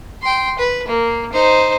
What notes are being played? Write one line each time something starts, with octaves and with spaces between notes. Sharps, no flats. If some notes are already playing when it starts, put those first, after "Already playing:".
G5 C6
B4
A#3
D#4 C5